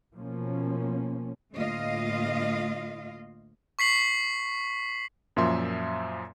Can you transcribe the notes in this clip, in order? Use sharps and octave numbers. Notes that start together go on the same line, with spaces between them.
B2 F3 A#3 C#4
D2 A2 A#3 F4 D#5 F5
C#6 B6 C7 F#7
F#2 A#2 F3 E5 C6